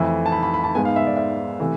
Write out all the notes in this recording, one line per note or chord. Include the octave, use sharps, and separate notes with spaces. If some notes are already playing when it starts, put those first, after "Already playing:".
Already playing: F2 E3 A3
A5
B5
B5
B5
A5
G#2 G#3 B3 G#5
F5
E5
D5
E5
C3 E3 A3